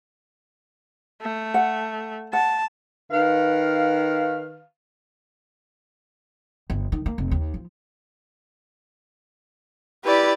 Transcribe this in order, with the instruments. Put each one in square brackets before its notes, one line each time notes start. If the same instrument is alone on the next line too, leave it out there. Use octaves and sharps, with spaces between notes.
[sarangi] A3
[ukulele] F#5
[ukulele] F#5 [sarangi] A5
[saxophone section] D#3 B4 F5
[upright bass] G1
D#3
A#3
F1
D#2
F3
[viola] E4 B4 [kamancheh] G4 D5